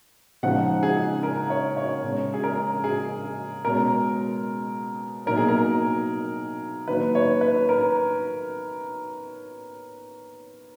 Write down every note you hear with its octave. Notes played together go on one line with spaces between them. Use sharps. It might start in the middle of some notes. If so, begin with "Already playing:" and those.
C#3 F3 G#3 D#4 F#5
G#4
A#4
C#5
C#5
C#3 G#3 C#4
G#4
A#4
G#4
B2 G#3 C#4 A#4
B2 F#3 A#3 D#4 A#4
G#4
A#4
D#3 F#3 A#3 B4
C#5
B4
A#4